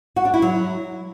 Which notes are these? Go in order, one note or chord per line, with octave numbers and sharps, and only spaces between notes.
F#4
D4
E4
F#3